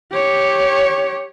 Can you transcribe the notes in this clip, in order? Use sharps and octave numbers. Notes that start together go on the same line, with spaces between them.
G4 C#5